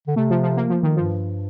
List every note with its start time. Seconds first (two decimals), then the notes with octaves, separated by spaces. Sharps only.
0.07 D3
0.16 C3 A3
0.30 F3
0.43 F3
0.57 A#3
0.70 F3
0.83 D#3
0.97 G2 F3